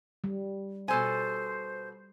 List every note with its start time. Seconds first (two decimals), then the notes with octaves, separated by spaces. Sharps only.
0.24 G3
0.88 B2 A4 C5 G#5